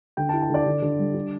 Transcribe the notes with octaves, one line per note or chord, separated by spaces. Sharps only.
D3 G5
E4 A5
A5
D3 D5
D3
D3
G3
D4